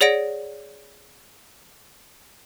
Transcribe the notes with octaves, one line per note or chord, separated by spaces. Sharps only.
G#4 C#5 D5 F#5 A#6 D7